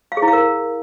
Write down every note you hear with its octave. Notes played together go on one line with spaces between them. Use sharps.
F5
G#4
E4
F5
A#4